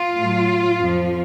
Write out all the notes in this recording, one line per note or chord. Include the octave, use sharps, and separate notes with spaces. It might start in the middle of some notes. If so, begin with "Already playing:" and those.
Already playing: F4
A2 F#3
F2 F3